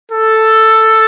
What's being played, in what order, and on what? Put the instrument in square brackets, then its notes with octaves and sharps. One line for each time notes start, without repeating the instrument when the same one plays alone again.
[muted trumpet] A4